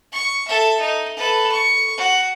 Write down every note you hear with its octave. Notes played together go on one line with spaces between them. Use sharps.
C#6
A4 E5
D#4
A4 B4
C#6
F#4